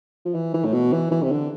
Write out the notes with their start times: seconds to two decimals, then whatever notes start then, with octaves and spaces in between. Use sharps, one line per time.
0.25 F3
0.34 E3
0.54 E3
0.64 A2
0.73 B2
0.92 E3
1.11 E3
1.23 C3
1.31 D3